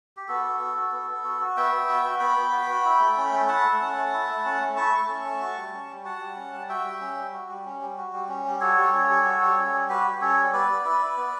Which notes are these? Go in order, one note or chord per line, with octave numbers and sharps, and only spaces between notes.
G4
B3 F#4 A4
B3
F#4
F#4
B3
B3
F#4
F#4
B3 E5 G5
B3
F#4
F#4
B3 G5 B5
B3
F#4
F#4
E4
A3
C#4
A3
E4 F#5 A5
A3
C#4
A3
E4
A3
C#4
A3
E4 A5 C#6
A3
C#4
A3
F#4
G3
C#4
G3
F#4 F#5 A5
G3
C#4
G3
F#4 E5 G5
G3
C#4
G3
F#4
G3
C#4
G3
F#4
G3
C#4
G3
F#4 A4 C#5
G3
C#4
G3
F#4
G3
C#4
G3
F#4 G4 B4
G3
C#4 A4 C#5
G3
B3 B4 D5
B3
E4
E4
B3